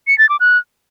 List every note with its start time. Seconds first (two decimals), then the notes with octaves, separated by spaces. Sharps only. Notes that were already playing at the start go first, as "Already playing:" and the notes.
0.07 C#7
0.18 A6
0.29 D6
0.40 F#6